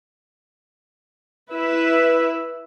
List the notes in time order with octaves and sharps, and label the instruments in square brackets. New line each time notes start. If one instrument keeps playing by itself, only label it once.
[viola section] E4 B4 E5